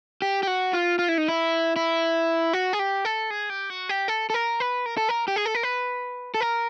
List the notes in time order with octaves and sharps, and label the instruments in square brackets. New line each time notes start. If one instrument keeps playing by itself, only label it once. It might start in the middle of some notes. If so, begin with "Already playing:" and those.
[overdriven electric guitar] G4
G4
F#4
F4
F4
E4
D#4
E4
E4
F#4
G#4
G4
A4
G#4
G4
F#4
G4
A4
A4
A#4
B4
A#4
A4
A#4
G4
G#4
A4
A#4
B4
A4
A#4